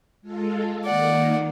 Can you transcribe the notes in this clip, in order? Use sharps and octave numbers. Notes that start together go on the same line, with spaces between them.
G#3 F4 A4
D#3 A#3 D5 F#5